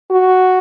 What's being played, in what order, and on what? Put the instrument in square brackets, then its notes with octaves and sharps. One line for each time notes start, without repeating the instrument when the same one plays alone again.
[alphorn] F#4